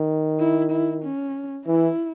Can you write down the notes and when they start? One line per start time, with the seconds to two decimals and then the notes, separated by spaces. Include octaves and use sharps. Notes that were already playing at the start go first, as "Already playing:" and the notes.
Already playing: D#3
0.40 E4
0.71 E4
1.03 C#4
1.66 E3 E4